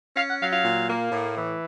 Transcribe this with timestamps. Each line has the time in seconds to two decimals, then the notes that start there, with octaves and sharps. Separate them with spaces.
0.16 C#4 F5
0.28 F#5
0.41 F#3 F5
0.52 F5
0.65 A#2
0.89 A#3
1.12 A2
1.37 E3